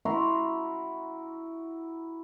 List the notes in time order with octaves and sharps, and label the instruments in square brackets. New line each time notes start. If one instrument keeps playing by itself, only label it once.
[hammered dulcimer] E4 F#4 A#5 C6